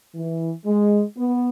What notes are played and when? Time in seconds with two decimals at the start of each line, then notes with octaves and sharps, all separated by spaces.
0.15 E3
0.66 G#3
1.17 B3